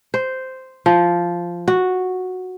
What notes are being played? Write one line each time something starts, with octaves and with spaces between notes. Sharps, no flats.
C5
F3
F#4